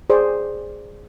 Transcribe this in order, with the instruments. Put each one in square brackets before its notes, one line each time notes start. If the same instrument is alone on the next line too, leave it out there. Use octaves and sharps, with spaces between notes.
[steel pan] G#4 C5 D5